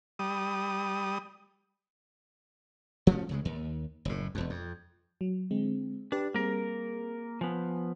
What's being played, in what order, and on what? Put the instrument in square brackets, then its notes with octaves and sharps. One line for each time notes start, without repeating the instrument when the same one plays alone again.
[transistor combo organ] G3 D#6
[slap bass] F3 A3 B3 C#4
C#2 C#3 G#3
D#2
F#1 A2
E1 F2
F2
[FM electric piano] F#3
D3 G#3 C4
[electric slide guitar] D4 [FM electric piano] G4 B4
[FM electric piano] G3 C4 G#4 [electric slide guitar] A#3 A#4
[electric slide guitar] F3 B3 [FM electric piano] G#5